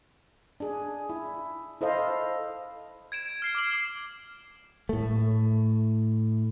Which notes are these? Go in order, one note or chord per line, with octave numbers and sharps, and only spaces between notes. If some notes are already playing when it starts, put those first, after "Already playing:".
D4 G#4
E4
E4 A4 C5 D#5 F5
G#6 D7 E7
F6 C7 G7
D6 F6 F#7
A2 A3